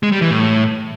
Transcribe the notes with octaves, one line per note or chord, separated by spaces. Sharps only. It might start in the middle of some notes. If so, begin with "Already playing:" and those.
G#3
G3
E3
A2